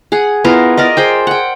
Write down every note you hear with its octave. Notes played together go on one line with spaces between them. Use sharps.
G#4 F#5
B3 E4 F4 A#4
A#4 D5 D#5
G#4 C5 G5
F#5 G5